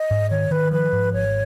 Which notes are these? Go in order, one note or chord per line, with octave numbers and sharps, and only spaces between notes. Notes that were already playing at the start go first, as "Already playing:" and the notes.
Already playing: D#5
G#2
D#3 C#5
D#3 B4
F3 B4
G#2
G#1 C#5